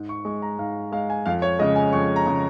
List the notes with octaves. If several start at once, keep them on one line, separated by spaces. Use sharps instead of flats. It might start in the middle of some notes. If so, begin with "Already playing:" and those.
Already playing: G#2
C#6
G#3 C#6
A#5
G#2 F5
G#3 F5
G#5
F2 F5
C#5
C#3 G#3 D#5
G#5
F2 C#6
A#5
C#3 G#3